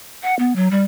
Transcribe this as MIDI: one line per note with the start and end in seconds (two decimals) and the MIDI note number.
0.23 0.34 78
0.39 0.55 59
0.56 0.71 54
0.71 0.84 55